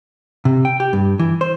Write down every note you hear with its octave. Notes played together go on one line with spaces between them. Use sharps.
C3
G5
G4
G2
E3
C5